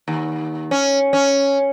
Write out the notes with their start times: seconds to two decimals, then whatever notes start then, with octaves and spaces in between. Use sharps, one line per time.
0.08 D#2
0.71 C#4
1.13 C#4